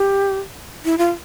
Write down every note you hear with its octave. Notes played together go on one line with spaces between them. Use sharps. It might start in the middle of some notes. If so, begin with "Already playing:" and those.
Already playing: G4
E4
F4